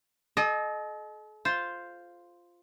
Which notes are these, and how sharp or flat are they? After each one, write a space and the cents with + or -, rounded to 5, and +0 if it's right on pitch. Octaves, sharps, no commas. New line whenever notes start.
A4 -45 D#5 -15
F4 +0 C5 +0